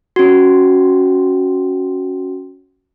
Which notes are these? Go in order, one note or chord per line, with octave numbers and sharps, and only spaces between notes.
C#4 F#4